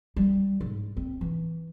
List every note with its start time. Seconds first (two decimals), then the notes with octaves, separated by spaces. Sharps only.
0.16 G3
0.61 G#2
0.97 C4
1.21 E3